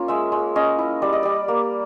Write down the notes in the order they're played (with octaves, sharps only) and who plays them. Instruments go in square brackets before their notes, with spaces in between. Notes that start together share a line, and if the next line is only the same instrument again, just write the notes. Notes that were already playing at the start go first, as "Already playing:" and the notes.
Already playing: [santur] A#3 C#4 F4 C#5
G#3 E5
G#3
C#4 D#5
E4
G3 D5
D#5
G3 D5
A#3